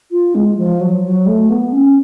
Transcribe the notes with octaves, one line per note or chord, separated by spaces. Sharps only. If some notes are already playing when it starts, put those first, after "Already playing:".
F4
G#3
F3
F#3
F#3
A3
B3
C#4